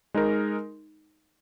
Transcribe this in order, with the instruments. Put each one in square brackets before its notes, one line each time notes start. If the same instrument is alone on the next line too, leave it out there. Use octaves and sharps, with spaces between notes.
[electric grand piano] G#3 D#4 A#4